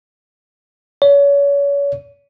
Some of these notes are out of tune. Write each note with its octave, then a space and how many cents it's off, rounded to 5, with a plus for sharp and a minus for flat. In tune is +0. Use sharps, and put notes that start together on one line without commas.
C#5 +35